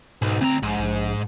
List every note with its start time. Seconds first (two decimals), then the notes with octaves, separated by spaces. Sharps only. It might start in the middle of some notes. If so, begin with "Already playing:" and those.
0.22 B1 G#2
0.41 D2 C4 A#5
0.63 A#1 G#2
0.80 A#1